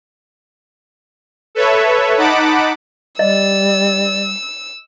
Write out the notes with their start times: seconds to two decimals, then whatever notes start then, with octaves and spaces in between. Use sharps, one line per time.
1.55 A4 B4 C#5 E5
2.17 D#4 F#5 A5 B5 D6
3.19 G3 D5 D#5 E6